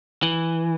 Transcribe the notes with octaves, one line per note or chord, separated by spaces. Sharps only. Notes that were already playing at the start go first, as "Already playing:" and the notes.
E3